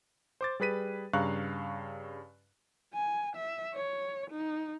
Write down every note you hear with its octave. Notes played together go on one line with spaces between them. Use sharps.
C5 D6 A6
G3 G#4 B4 B6 D#7
G2 C#3 F5 A#5 C#6 F#6
G#5
E5
C#5
D#4